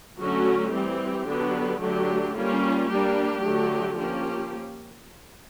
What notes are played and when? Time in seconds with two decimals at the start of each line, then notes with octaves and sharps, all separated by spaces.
0.18 D3 F#3 A3 C#4 F#4
0.73 E3 G3 C4 G4
1.27 D3 F#3 B3 D4
1.81 D3 F#3 A3 D4 G4
2.36 G3 A#3 C#4 F4
2.90 G3 A#3 D4 G4
3.45 D3 F#3 A3
3.99 F3 A#3 C#4 G4